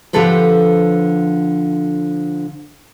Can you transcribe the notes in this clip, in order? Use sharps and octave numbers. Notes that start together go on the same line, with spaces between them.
D3 F3 G4 A4 B4 C5